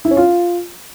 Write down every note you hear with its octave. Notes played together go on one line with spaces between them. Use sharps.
E4
C#4
F4